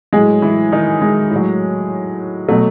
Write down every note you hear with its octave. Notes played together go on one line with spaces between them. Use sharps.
A2 F#3 G#3 G#4
E3 E4
D#3 D#4
G#3
A2 F#3
B2 F#3 A3